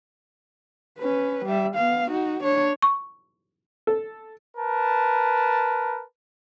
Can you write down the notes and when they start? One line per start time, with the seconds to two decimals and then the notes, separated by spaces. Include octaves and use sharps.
0.99 C#4 B4
1.45 G3 E5
1.75 B3 F5
2.10 D#4 F#4
2.43 D4 C#5
2.82 C#6
3.87 A4
4.57 A#4 B4 A5